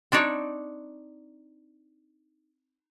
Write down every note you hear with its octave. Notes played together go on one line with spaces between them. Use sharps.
C4 D4 D#4 C#5 D5